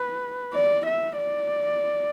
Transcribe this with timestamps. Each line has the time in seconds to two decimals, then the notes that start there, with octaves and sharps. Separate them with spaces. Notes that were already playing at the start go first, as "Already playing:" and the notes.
Already playing: B4
0.54 D5
0.86 E5
1.18 D5